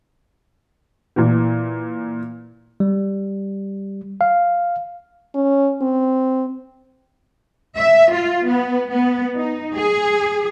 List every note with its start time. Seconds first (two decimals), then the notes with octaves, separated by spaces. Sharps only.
1.16 A#2 E3
2.80 G3
4.21 F5
5.35 C#4
5.81 C4
7.78 E5
8.12 F4
8.48 B3
8.92 B3
9.36 D#4
9.76 G#4